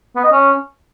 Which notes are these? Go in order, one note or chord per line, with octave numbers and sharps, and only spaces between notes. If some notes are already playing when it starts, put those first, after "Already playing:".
B3
D#5
C#4